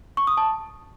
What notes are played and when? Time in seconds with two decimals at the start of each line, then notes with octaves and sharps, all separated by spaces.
0.17 C#6
0.27 D#6
0.37 A5